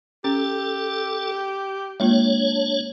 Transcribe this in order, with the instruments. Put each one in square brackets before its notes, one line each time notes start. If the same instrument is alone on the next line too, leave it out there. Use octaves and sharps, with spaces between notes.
[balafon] C#4 [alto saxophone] G4 [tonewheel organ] A4
[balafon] G#3 A#3 F4 [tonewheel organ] D4 C#5